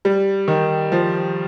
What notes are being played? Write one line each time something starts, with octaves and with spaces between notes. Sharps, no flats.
G3
D#3
F3